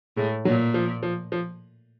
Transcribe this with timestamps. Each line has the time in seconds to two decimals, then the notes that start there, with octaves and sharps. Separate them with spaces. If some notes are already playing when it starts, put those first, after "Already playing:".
0.17 A2 G#3
0.45 A#2 F#3
0.74 F3
1.03 F3
1.32 F3